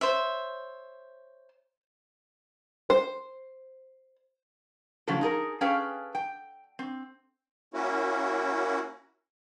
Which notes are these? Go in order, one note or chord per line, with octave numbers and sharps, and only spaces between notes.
C5 C#5 E5
C5
A2 C#3 F3 F#3 A4
D#4 G#4 A#4
C#4 G#4 A4 B4 F5 G5
G5
C4
A#3 C#4 E4 F#4